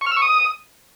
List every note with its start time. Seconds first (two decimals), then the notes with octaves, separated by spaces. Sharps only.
0.01 C#6
0.06 F6
0.11 E6
0.17 C#6
0.22 D#6